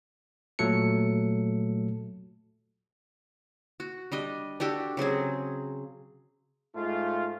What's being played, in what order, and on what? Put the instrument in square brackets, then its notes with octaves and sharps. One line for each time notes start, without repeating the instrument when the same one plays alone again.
[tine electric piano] A#2 F#3 A3 A4 C#7
[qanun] F#4
G3 D4 D#5
D4 F#4 G4 A4
C#3 F#3 C4 G#4
[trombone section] G#2 A3 F4